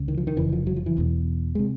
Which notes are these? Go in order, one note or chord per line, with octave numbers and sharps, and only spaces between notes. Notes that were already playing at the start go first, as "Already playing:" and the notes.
Already playing: C#2 C#3
D#3
F3
D#3
F1 F2 C#3 E3
F3
F#3
F3
E3
E1 E2 B2
C3 G#3